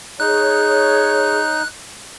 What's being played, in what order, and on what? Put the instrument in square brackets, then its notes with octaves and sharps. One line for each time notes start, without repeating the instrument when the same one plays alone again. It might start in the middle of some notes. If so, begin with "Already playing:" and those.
[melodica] D#4 [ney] G#4 [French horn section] C#5 [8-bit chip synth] F#6